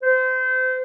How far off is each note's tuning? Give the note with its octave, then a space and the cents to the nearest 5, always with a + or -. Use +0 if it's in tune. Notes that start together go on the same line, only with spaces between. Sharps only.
C5 -30